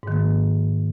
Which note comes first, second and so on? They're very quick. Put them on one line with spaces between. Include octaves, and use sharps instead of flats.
G#2 D#3 A#3